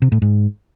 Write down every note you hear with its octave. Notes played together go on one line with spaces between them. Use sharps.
C3
A2
G#2